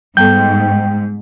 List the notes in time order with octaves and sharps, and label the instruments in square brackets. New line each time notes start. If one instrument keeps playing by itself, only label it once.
[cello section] G#2 [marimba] G3 B3 A4 [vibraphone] G5 [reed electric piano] G6